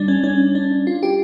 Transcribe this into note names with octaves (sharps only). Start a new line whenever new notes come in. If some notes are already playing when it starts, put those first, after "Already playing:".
Already playing: G3 D4
C#4
C#4
D4
F4
G4